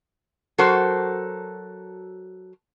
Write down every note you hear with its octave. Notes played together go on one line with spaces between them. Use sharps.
F#3 F#4 A4 A#4 C5